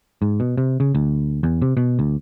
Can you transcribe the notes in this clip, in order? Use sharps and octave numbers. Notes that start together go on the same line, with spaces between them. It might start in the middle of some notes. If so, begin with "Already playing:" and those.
G#2
B2
C3
C#3
D2
E2
C3
B2
D2